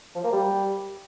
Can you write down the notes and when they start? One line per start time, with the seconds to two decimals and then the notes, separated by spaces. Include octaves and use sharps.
0.15 F3
0.24 A#3
0.32 G3